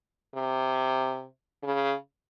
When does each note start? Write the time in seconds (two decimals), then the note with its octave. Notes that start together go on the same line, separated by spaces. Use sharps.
0.35 C3
1.63 C#3